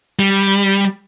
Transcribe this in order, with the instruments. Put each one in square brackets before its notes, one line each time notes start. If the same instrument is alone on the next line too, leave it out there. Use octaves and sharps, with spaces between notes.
[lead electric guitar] G3